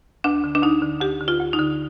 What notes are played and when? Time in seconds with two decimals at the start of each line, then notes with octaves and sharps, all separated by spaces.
0.24 D2 D4
0.44 D3
0.55 D4
0.63 D2 D#4
0.82 D3
1.01 D2 G4
1.21 D3
1.28 F4
1.40 D2
1.53 D#4
1.59 D3